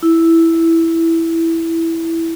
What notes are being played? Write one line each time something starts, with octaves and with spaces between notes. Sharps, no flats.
E4